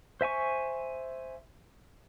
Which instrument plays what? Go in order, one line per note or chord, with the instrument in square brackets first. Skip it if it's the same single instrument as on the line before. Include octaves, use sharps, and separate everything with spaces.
[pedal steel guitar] C5 E5 G#5 C#6